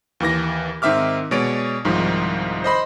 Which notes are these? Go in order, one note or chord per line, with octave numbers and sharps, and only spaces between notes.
D#2 E3 D6 A#6
G#2 D#3 C4 E5 D6 F6
B2 G#3 C#5 D5 D7
C2 G#2 D#3 F3
C5 D#5 B5 C6